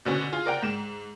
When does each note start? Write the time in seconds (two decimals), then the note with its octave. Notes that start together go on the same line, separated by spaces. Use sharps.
0.05 B2 D3 B3 C#4
0.32 F4 G#4
0.46 A#4 D5 F#5 G5 A#5
0.62 G#2 E7